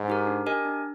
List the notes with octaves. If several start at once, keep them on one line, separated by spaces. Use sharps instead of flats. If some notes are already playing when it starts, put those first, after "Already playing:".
Already playing: G#2
D#4 G4 A#4
D4
G4 A#4 D#5 G#5
D4